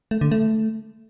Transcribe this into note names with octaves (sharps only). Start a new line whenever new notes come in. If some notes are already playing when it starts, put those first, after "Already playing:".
A3
D3
A3